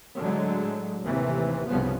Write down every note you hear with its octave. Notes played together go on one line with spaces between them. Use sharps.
A2 D3 F#3 G#3
D#2 A2 C3 E3
C2 G2 C#3 F3 B3